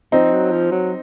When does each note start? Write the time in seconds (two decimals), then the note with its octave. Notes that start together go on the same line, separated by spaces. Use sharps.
0.12 F3 C4 D#4
0.32 F#3
0.51 F3
0.71 F#3